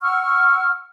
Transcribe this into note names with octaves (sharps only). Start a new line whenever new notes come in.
F#5 C#6 E6 F6